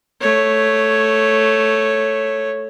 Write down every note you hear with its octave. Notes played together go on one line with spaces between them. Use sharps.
A3 C#5